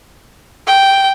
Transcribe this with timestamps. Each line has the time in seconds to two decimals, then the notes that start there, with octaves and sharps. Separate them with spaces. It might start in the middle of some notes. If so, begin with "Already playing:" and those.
0.67 G5